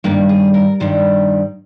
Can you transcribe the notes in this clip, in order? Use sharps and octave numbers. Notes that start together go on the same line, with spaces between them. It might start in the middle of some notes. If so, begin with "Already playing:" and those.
G2 D#3 G3 A#3
G#4
A#4
G2 D#3 G3 C5